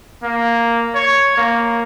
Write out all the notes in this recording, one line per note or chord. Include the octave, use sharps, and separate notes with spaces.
A#3
C#5
A#3